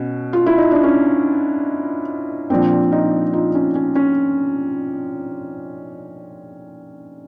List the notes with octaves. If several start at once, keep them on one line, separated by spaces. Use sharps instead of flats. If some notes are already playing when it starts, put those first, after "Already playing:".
Already playing: B2 C#4
F4
E4
D#4
D4
C#4
A#2 F3 C4 D4
D#4 F4
D#4 F4
C#4
C#4
C#4